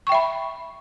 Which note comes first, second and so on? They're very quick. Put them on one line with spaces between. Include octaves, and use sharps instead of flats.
C#6 G5 E5 B5